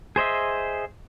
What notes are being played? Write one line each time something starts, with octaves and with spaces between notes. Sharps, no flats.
G#4 C5 D#5 E5